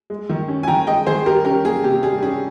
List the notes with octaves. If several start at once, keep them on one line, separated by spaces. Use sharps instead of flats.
G#3
D#3
C#4
G#5
D#3 G5 A#5
G#3 D#5 G5
D#3 G#4 C5
G3 G4 A#4
C#4 G4 A#4
A#3 G#4
C3 G4
G3 G#4
C#4 G#4